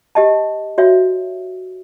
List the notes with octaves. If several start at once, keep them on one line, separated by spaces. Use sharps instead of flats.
G4 D#5 A5
F#4 C#5 E5